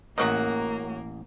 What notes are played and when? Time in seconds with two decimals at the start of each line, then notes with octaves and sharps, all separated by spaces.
0.18 A1 C#3 F#3 A#3 F#4 A#4 D#5